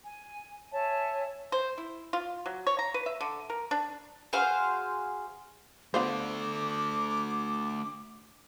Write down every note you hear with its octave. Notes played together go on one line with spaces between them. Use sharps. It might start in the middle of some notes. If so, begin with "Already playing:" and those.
G#5
C#5 E5 G#5 A5
C5
E4
F4
F#3
C#5
A#5
B4
E5
D3
A#4
D4
F#4 G#4 C5 F5
A3 B3 D4 F4 C5 D6